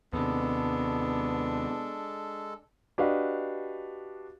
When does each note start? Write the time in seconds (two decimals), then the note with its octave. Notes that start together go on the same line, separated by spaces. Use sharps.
0.13 D#2 C3 G#3 B3 D4 A4
2.98 D4 F#4 G4 B4 D#5 F5